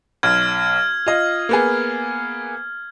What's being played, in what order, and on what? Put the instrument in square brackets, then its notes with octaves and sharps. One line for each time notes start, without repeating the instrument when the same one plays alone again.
[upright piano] B1 [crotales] F6 G#6
[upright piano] F4 D#5
A#3 B3 G#4